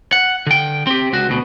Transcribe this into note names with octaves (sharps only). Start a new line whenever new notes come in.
F#5
D3 G5
C4 G4
C#2 F#4
D2 B2